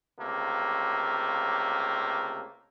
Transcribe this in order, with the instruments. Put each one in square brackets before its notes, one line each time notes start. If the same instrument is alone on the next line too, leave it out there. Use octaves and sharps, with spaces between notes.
[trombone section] C#2 C3 A3 A#3